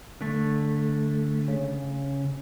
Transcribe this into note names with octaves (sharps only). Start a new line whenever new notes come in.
D3 A3
C#3